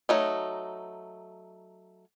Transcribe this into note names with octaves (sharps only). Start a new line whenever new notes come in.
F#3 A3 D#4